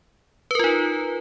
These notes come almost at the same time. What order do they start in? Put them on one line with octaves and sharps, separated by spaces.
B4 A#4 F4 D#4